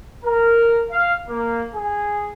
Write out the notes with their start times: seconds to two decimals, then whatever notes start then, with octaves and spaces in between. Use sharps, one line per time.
0.25 A#4
0.92 F5
1.29 A#3
1.74 G#4